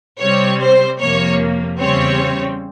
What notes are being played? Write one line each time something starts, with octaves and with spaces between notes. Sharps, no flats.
C3 G3 C4 C#5
C5
F2 C3 F3 A#3 C#5
E2 C#3 G3 C4 C#5